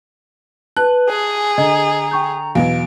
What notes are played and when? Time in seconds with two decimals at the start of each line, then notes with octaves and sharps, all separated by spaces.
0.77 B4 A5 F#6
1.10 G#4 G#5
1.58 D3 D#5 A#5
2.11 G5 C#6 G6
2.55 E2 B2 F#3 F5 D7